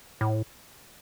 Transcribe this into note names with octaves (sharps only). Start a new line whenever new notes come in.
A2